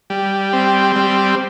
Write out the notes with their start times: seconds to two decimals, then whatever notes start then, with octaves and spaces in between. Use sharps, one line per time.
0.10 G3
0.53 C4
0.96 G3